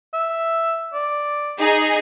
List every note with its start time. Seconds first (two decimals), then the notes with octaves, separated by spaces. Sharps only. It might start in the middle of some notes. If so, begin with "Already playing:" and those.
0.14 E5
0.93 D5
1.59 D#4 G#4